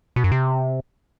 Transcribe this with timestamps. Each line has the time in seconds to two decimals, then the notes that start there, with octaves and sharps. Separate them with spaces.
0.16 B2
0.24 F#2
0.32 C3